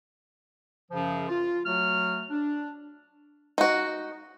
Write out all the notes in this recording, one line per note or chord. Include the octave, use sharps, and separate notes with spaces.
F#2 C#3 F3
F4
F#3 A3 F#4 F6
D4
D#4 F#4